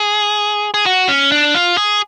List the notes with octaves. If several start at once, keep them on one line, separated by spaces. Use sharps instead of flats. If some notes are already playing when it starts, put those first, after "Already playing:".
Already playing: G#4
G#4
F#4
C#4
D4
F4
G#4